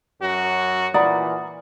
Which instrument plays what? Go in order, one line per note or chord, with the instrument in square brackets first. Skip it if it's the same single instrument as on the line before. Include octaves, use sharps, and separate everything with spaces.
[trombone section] F#2 F#3 F#4
[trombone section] A#2 E3 [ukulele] D5 B5 [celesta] F#5 A#5 D#6